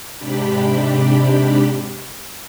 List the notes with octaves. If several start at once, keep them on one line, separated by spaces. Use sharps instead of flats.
G#2 C3 D4 G4 B5